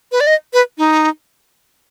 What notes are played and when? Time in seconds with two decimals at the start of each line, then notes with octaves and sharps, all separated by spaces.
0.12 B4
0.20 D5
0.27 D#5
0.53 B4
0.78 D#4